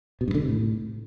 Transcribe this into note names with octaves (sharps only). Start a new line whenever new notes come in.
B2
G2
D3
C3
A2